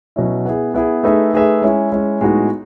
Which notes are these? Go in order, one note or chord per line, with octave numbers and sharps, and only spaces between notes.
B2 F#3 C#4 E4
B3 E4 G#4
B3 E4 G#4
A3 D#4 G#4 B4 E5
A3 D#4 G#4 B4 E5
G#3 C#4 E4
G#3 C#4 E4
A2 G#3 B3 D#4 F#4